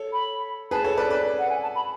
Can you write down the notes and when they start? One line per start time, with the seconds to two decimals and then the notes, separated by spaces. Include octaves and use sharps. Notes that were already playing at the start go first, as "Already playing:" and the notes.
Already playing: A4 C#5
0.13 B5
0.71 G#4 B4 A5
0.84 A4 C#5
0.97 B4 D5
1.10 B4 D5
1.39 F#5
1.50 G#5
1.63 A5
1.75 B5